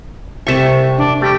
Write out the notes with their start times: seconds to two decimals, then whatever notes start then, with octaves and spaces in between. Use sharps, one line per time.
0.47 C2 C3 A3 E5 C#6
0.98 D4
1.21 G3 A3 G4